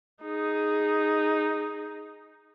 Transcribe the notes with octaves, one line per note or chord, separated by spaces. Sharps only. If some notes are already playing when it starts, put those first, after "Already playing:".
D#4 G#4